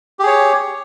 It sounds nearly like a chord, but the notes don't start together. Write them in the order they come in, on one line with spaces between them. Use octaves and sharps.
G4 G#4 C#5